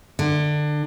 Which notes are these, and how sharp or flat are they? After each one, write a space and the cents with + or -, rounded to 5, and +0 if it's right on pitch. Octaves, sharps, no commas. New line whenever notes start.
D3 +25